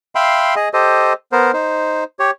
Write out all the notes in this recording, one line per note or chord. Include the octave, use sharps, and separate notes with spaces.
E5 F5 G5 B5 C6
G#4 D#5
G4 A4 C5 D#5
B3 A#4 C5
D#4 C5
G4 C#5